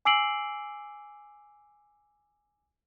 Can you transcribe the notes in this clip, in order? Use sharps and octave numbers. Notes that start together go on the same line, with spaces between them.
G#5 D6 E6 C7 D7 F#7